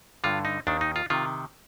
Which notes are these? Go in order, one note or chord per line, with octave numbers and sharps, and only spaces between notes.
G2 D3 F4
D#4
D#2 D#3 D4
D#4
F4
C3 D#3 F4